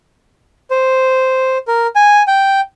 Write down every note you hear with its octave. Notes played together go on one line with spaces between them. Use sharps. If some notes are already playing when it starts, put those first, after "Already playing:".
C5
A#4
G#5
G5